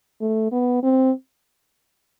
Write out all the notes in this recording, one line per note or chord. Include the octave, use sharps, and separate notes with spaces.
A3
B3
C4